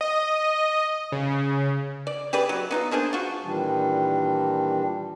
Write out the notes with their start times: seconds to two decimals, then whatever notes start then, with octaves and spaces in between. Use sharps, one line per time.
0.01 D#5
1.12 C#3
2.07 D5
2.33 G4 G#4 B4 D5
2.49 F#3
2.71 B3 D#4 F4
2.91 A#3 D4 G#4 C5
3.13 F4 F#4
3.43 A#2 D#3 E3 G3 D4